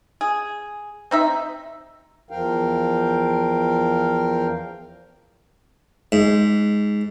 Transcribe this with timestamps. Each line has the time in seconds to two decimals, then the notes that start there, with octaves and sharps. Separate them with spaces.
0.21 G#4
1.11 C4 D#4 E5
2.31 E2 F3 A#4 F5 G5
6.12 G#2